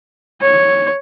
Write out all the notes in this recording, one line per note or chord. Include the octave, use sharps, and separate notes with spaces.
C#5